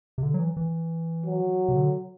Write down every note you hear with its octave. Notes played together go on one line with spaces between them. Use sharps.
C3
D3
F#3
E3
E3
F#3
C3
D3